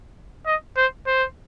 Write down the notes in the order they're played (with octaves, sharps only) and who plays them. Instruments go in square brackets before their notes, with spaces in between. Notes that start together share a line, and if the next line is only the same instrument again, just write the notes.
[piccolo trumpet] D#5
C5
C5